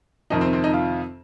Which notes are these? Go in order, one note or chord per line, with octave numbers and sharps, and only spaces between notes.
F2 C3 D#3 D#4
C4
C4
D#4
F4